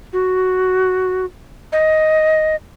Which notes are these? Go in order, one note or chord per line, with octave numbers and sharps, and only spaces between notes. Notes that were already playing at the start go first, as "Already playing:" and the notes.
F#4
D#5